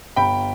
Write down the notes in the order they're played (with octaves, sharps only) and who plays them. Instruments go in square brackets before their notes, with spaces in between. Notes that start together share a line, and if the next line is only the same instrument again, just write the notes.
[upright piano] G1 G5 B5